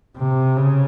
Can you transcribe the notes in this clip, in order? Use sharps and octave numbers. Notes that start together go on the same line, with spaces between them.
C3
C#3